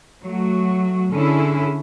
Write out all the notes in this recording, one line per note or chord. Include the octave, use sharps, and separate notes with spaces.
F#3 A3 F#4
D3 C#4 E4 G#4 A4